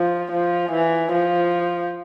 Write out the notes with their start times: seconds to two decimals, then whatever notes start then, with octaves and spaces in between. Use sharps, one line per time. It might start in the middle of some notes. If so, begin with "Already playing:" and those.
Already playing: F3
0.32 F3
0.72 E3
1.12 F3